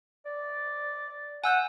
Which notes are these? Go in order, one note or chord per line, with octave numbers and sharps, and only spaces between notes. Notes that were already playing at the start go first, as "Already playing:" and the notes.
D5
F#5 G#5 E6 G6